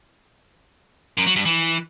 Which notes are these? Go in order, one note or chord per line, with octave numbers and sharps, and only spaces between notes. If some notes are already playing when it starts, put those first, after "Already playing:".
F#2
F#3
G2
E3